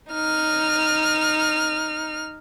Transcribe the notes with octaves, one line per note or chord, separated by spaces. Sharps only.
D#4 F6